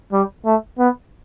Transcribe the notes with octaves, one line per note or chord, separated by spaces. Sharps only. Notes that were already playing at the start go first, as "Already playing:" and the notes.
G3
A3
B3